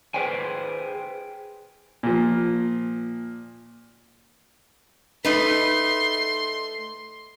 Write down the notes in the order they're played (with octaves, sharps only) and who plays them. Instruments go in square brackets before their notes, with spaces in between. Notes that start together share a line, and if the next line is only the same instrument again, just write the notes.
[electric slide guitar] G#4 B4 C5 G5 G#5
[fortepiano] A#2 F3
[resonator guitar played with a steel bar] A3 D#4 B4 [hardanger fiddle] C6